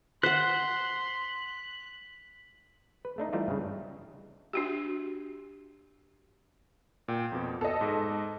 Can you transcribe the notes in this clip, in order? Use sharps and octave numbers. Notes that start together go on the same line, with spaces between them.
C5 F#5 C6 F#6 B6
B4
A3 D4 D#4
E3 G3 A3 D#4 F4
G2 C#3
D4 F#4 G4
A#2 G5
F2 B2
B3 A4 D#5
G#2